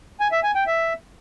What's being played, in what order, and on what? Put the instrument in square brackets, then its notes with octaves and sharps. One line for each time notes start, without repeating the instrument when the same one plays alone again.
[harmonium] G#5
E5
G#5
G5
E5